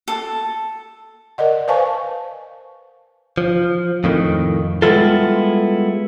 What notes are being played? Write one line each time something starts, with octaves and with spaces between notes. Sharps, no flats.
A4
A#4 D5 D#5 F#5
B4 C5 F5 G#5 A5 C#6
F3
F2 A2 D#3
G3 G#3 B3 E4 F4 A4